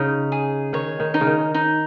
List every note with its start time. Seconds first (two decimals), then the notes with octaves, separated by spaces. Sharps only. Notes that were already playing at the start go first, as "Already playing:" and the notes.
Already playing: C#3 D#4
0.32 G#4
0.73 D#3 C#5
1.00 D#3
1.14 D#4
1.21 C#3
1.27 D#3
1.55 D#4